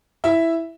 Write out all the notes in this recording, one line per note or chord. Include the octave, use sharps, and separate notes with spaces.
E4 E5